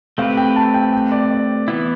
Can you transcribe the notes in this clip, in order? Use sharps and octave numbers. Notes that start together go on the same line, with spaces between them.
A3 C4 G4 B4 F5
G5
A5
G5
G5
D5
D5
E3 B3 E4